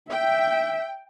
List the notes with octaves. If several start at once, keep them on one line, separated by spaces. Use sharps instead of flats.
E5 G5